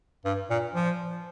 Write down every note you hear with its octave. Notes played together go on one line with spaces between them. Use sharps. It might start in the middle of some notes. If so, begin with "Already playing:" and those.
G2
A#2
F3